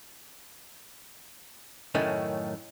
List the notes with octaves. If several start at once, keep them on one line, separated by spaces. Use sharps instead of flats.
F#2 A2 D#3 A3 C#4